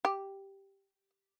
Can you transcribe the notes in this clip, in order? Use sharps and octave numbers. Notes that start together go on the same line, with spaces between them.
G4